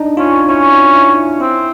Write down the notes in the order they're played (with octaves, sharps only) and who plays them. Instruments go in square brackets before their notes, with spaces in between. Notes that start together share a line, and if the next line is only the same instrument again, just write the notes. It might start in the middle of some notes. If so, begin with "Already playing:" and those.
Already playing: [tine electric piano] D4 D#4
[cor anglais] C#4 [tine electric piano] F4
[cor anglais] C#4 [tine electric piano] E4
[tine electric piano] E4
[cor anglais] C4 [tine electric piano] E4